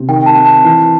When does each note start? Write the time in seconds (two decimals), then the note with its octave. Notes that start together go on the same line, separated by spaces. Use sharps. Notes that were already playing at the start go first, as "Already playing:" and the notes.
Already playing: C3 C4
0.09 D#3 G5
0.26 A5
0.36 C4
0.45 A5
0.64 E3